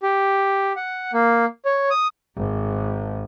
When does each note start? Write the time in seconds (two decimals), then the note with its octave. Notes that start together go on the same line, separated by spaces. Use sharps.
0.03 G4
0.76 F#5
1.13 A#3
1.65 C#5
1.91 D#6
2.36 G#1